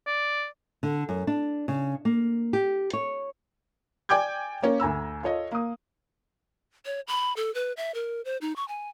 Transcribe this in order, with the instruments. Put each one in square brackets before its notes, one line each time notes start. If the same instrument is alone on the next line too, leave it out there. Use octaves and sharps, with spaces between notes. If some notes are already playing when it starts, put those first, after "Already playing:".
[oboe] D5
[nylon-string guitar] D3
F#2
D4
C#3
A#3
G4
C#5
[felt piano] D5 G5 G#5 D6 G6 G#6
A#3 C#4 A#4
D2 G#5 A#5 E6
F4 A4 C#5 D#5
A#3 D#6
[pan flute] C#5
B5
A4
B4
E5
A#4
C5
D#4
C#6
G#5